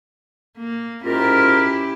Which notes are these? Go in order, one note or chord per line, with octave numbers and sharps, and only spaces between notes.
A#3
G#2 C#4 E4 F4 G4 A#4